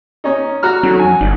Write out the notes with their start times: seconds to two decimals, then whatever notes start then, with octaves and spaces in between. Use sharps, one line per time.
0.24 C#4 D#4
0.63 F#4 A#5 F6
0.83 F#3 C#4 D#4 A4
1.00 F2 G#5
1.21 G1 D#4 D5